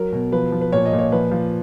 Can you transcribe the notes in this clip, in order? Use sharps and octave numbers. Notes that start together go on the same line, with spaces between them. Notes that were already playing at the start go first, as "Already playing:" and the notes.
Already playing: F#3 A#4
B2
F3 B4
F3
B4
A#2 C#5
D#5
A#2
C#5
F3 B4
F3